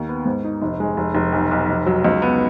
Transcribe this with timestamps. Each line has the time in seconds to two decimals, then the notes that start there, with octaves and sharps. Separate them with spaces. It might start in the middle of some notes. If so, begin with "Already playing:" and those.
Already playing: D#2
0.09 B3
0.25 G#2
0.44 D#4
0.62 F1
0.80 G#3
0.97 F1
1.15 F1
1.33 B1
1.51 B1
1.69 F1
1.86 F#3
2.04 C#2
2.22 B3